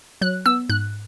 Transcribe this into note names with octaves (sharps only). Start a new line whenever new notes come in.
F#3 F#6
B3 E6
G#2 F#6